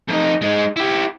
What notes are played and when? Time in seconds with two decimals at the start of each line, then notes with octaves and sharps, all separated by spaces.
0.08 F2 D#4
0.41 G#3 D#4
0.76 E4 G4